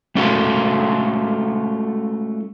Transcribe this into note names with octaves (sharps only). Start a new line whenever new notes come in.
G#3 A3 C#4 F4 F#4 A4